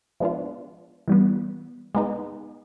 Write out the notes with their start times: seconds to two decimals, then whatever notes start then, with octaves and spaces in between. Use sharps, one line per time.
0.20 F3 G#3 B3 D4 F4
1.08 E3 G3 B3
1.95 G#3 B3 D#4